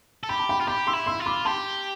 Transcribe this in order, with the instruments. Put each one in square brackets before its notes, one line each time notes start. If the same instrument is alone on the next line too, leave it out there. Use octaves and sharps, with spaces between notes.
[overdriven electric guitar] A4
[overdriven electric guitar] G4 [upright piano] B5
[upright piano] A5
G5 B5
[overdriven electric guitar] F4
[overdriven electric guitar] G4 [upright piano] B5 D6
[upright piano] C6 E6
[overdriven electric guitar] E4
[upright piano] C6 E6
[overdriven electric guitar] F4
[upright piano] B5 D6
[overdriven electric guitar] G4 [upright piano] A5 C6